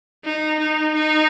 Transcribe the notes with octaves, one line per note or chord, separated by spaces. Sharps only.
D#4
D#4
D#4